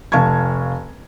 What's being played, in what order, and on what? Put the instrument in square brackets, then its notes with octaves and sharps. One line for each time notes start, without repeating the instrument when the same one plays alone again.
[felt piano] F1 F5 A5 C#6 G#6